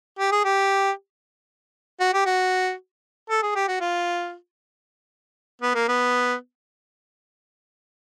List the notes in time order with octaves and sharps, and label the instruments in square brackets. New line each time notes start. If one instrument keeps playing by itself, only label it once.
[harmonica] G4
G#4
G4
F#4
G4
F#4
A4
G#4
G4
F#4
F4
B3
A#3
B3